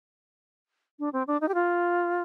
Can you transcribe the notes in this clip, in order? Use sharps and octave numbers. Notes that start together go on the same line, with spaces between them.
D4
C4
D4
D#4
G4
F4